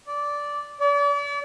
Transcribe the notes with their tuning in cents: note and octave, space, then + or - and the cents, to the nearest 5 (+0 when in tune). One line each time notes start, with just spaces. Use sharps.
D5 -10
D5 -40